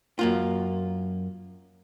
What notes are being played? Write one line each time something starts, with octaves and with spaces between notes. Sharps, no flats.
F#2 A#3 F4